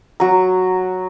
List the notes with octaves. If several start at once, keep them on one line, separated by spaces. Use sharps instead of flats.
F#3 A#5